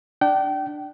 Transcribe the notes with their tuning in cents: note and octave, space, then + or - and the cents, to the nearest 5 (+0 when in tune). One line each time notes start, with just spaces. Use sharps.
D4 +10 G5 -30